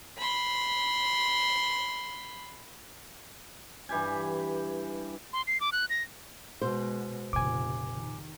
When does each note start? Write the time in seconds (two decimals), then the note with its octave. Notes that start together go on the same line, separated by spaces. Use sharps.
0.17 B5 C6
3.89 G2 E3 G4 G#5
5.33 C6
5.47 C7
5.61 D6
5.72 F#6
5.90 A#6
6.62 B2 G#3 C5
7.33 F1 A#2 C#3 G#5 D6
7.94 D#3